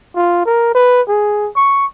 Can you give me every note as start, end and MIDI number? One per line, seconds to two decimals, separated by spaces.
0.15 0.42 65
0.46 0.74 70
0.75 1.02 71
1.08 1.49 68
1.56 1.86 85